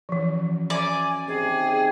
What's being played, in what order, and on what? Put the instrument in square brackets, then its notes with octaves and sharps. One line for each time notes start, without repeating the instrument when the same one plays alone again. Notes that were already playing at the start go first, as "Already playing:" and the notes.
[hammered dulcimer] F#2 [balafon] E3 F3
[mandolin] D5 [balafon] E5 [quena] G#5
[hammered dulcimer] C3 D#3 G4 [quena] G#4